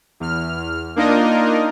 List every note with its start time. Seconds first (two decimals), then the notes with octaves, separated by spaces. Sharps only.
0.20 E2 F6
0.96 A#3 D4 D#4 F4 A#4 D#5